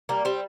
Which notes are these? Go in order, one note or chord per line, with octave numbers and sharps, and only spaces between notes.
G3 A#3
G3 C4